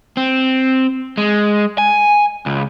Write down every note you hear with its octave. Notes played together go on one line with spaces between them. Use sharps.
C4
G#3
G#5
C#2